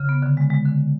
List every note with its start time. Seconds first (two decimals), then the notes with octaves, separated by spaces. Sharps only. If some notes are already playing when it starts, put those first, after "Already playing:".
Already playing: C#3
0.09 B3
0.22 D3
0.37 G#3
0.50 G#3
0.65 D3